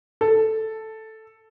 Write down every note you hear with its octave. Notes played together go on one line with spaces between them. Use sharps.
A4